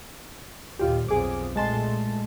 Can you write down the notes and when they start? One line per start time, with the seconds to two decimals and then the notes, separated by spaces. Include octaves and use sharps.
0.79 D#2 A#2 F4 G4
1.08 B1 F2 G#4 D6
1.56 A#2 G#3 A3 A5 C6